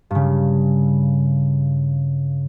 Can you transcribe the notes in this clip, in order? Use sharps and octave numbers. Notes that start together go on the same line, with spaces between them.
G2 C#3